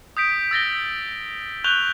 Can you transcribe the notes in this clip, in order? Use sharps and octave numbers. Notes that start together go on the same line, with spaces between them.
D#6 G6 B6 D7
E6 A6 A#6 G7
C#6 F#6 G6 F7 G7